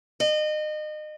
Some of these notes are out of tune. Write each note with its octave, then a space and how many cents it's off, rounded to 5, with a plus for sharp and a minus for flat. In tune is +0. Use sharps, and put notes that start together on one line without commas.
D#5 -30